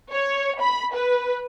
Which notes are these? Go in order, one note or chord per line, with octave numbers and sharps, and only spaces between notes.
C#5
B5
B4